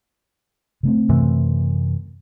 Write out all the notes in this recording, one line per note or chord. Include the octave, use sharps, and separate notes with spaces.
C#3 A3 C4
F#2 C3 E3